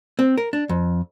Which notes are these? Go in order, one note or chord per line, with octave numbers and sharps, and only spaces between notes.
C4
A#4
D4
F2